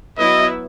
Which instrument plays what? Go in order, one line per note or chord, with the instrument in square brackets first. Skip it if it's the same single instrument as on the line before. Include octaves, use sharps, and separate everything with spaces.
[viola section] F#3 B3 E4 B4 E5 [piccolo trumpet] D#5